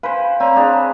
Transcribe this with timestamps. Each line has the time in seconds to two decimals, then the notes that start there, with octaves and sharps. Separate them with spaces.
0.03 B4 C5 F5 G#5
0.40 C4 C#5 D5 F5 A#5
0.56 D4 G#4 C5
0.73 B5